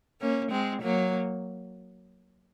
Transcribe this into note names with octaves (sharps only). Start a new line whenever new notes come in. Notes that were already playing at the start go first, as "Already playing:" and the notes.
A#3 C#4
G#3 C4
F#3 A#3